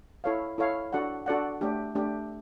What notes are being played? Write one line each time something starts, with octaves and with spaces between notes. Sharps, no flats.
E4 A4 C#5 F5
E4 A4 C#5 F5
D4 F#4 A4 D5 F#5
D4 F#4 A4 D5 F#5
A3 D4 G4
A3 D4 G4